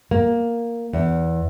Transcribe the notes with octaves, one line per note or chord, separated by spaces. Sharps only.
A#3
E2